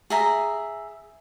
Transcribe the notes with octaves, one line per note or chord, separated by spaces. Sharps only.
G#4 E5 A#5